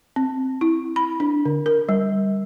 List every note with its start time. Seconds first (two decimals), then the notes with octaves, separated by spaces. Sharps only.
0.16 C4
0.61 E4
0.96 B5
1.20 D4
1.45 D3
1.66 A#4
1.89 G3